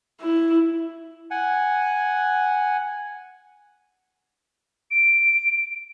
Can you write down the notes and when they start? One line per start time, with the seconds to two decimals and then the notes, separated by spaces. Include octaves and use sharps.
0.20 E4
1.31 F#5 G#5
4.91 D7